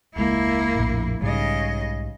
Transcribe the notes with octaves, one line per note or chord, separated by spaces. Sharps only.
E1 C#2 G#3 A#3 E4
A#1 F2 A2
B1 G#2 C#3 G3 D#5